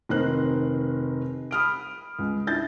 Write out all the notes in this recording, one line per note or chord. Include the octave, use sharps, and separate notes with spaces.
F1 D#3 D#4 A#4 C5 F#6
B5 D#6 F6 D7
C#2
D4 E4 G6 A6